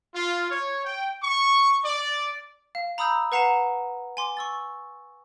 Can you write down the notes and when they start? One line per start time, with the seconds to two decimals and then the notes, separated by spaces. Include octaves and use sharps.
0.15 F4
0.51 C#5
0.84 G5
1.23 C#6
1.84 D5
2.75 F5
2.98 A#5 B5 D#6 E6 G6
3.32 B4 F#5 A#5 C7 E7
4.17 G#5 C6 D6
4.37 C#6 E6 A6